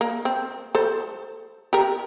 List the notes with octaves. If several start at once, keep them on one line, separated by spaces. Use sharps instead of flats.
A#3
C4
A4 C5
G4 A#4